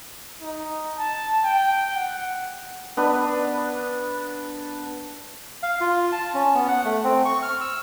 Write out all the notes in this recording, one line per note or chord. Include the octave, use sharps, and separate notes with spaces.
D#4
A5
G5
F#5
B3 D4 B4
F5
F4
A5
C#4
B3
F#5
A3
C4
C#6
F6
E6